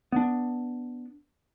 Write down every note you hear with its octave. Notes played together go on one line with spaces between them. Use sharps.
B3 D4